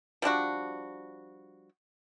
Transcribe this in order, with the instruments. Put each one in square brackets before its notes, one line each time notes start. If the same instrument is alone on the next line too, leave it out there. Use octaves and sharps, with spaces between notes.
[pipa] F3 G3 D4 F#4